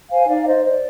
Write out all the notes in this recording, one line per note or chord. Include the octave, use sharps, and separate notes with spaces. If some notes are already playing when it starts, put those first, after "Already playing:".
C5 F5 G#5
D#4 D5 F5
C5 D#5
C5 D5